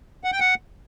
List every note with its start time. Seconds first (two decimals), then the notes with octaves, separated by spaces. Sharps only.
0.24 F#5
0.32 G5
0.40 F#5